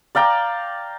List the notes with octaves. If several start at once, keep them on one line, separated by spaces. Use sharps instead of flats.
D5 F5 G5 A#5